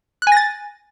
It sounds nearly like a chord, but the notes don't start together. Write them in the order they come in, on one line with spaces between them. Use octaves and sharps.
F#6 G#5 A#6 A6